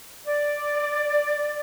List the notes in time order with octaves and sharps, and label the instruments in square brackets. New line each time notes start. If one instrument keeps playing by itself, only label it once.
[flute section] D5